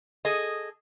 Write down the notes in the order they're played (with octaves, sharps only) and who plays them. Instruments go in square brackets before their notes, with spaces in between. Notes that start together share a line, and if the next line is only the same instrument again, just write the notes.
[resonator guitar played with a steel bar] G#4 A4 D#5